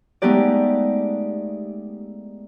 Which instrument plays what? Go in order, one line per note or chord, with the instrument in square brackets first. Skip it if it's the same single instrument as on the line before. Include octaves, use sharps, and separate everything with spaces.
[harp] G#3 A3 B3 D#4 G4 D5